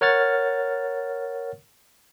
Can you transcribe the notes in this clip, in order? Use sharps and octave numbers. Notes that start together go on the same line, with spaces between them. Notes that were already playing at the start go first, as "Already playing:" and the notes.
A#4 C#5 F#5 F6 A6